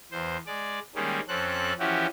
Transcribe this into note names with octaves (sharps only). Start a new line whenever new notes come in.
E2 C5
G#3 D5
D#3 G3 G#3 A#3 C#4
F2 C4 C#4 A4 F#6
E3 F3 C#4 E4 F#4 G4